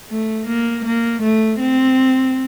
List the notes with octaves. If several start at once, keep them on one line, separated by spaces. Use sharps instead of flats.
A3
A#3
A#3
A3
C4